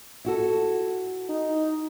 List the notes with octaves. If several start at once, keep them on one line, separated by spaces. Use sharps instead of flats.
E4 F#4 A4
D#4